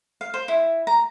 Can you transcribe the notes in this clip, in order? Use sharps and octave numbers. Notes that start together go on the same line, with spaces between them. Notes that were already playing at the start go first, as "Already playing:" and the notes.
F5
C5
E4
A#5